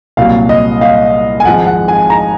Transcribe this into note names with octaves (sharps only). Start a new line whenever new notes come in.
C2 A#2 F#3 F5
D#5
F5
G#5
G#1 G#2 F3 G#3 F#5
F#5
G#5
A#5